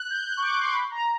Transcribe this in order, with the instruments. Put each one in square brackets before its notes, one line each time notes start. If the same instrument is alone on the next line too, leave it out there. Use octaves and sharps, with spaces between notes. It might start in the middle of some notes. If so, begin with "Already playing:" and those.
Already playing: [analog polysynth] F#6
G6
F#6
C#6
D6
C6
B5
A#5